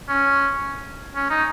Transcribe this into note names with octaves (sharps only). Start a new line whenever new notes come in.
C#4
C#4
D#4